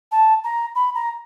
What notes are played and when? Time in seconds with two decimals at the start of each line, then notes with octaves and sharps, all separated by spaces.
0.12 A5
0.44 A#5
0.75 B5
0.95 A#5